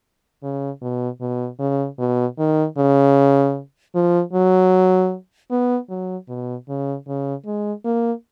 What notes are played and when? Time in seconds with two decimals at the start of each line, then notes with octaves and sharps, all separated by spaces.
0.43 C#3
0.82 B2
1.21 B2
1.59 C#3
1.99 B2
2.38 D#3
2.78 C#3
3.95 F3
4.33 F#3
5.51 B3
5.89 F#3
6.28 B2
6.69 C#3
7.07 C#3
7.46 G#3
7.85 A#3